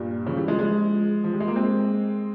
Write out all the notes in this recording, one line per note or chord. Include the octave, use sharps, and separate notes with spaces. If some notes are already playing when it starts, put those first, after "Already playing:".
Already playing: G2 A#2
C#3 F3
E3 G3
F3 G#3
F3 G#3
F3
G3
G#3
A#3
G#3 C4